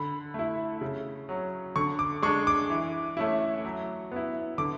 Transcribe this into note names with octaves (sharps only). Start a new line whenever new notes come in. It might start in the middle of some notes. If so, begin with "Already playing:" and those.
Already playing: D3 B5
A3 E4
C#3
F#3 C#4
D3 C#6
D6
G#3 D4 C#6
D6
E3
A3 C#4 E4
F#3
B3 E4
D3 D6